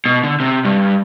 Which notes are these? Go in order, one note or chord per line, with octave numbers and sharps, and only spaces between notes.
B2
D3
C3
G2